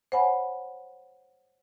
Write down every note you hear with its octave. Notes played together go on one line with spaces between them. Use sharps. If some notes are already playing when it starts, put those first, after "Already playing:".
C5 C#5 F#5 G#5 B5